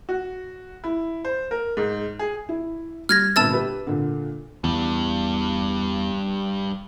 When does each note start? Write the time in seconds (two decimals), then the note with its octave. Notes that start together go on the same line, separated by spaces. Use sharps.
0.09 F#4
0.84 E4
1.25 C5
1.51 A#4
1.77 G#2
2.19 G#4
2.49 E4
3.09 G3 F6 G#6 A#6
3.36 G1 A#2 A5 E6 A6
3.53 G4 B4
3.87 A#2 D3
4.64 E2 G2 G3